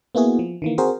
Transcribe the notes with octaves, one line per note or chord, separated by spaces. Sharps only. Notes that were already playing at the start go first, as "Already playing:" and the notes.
A#3 B3 E4 F#4 G#4
F3
D#3 E3 A#3
C4 F#4 G#4 A#4 C5